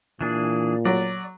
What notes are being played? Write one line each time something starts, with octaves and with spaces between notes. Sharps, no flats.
A#2 E3 D4 G#4
F#3 D5